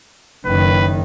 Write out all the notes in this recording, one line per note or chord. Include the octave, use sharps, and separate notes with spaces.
F#1 D#3 B4